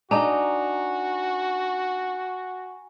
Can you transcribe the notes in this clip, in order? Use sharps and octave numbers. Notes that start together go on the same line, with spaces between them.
D4 D#4 F#4 D#5 G#5 A#5 F7